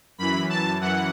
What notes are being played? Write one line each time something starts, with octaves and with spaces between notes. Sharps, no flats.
F#2 E3 B5
A5
F#2 E3 F#5